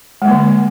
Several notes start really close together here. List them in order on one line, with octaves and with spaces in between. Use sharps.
G#3 G3 A#3 D3